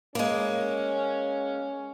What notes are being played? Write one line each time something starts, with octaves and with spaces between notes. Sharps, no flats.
G#3 A#3 C#4